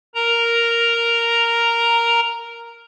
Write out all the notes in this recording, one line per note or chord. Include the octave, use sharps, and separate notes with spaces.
A#4 A#5